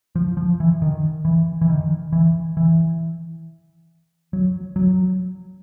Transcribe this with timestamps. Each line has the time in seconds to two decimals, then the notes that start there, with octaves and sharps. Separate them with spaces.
0.16 F3
0.37 F3
0.60 E3
0.82 D#3
1.25 E3
1.61 E3
1.69 D#3
2.12 E3
2.57 E3
4.33 F#3
4.76 F#3